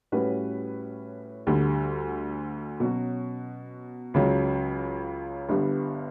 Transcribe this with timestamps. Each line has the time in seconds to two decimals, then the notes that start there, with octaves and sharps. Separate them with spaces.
0.12 A2 G3 C#4 F#4 B4
1.47 D2 D3 G3
2.80 B2 F#3 C#4 F#4
4.14 C#2 C#3 F#3
5.49 G1 G2 D3 G3 B3